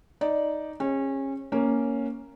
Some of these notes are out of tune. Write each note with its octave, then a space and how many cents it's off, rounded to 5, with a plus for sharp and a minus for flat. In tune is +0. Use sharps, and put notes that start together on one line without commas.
D#4 +0 D5 -5
C#4 -25 G#4 -30
A#3 +0 C#4 +0